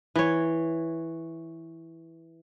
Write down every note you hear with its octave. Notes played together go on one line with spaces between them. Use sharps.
E3 C#5